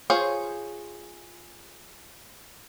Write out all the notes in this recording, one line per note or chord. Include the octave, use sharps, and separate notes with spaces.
F4 G#4 C5 C#5